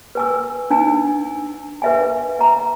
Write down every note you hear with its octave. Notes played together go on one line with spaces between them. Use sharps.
B4 G#5 E6
D4 D#4 G#5
B4 E5 G#5
E5 A#5